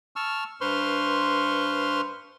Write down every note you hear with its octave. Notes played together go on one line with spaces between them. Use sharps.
A5 C#6 E6 F6
G2 B4 C5 C6 C#6 F6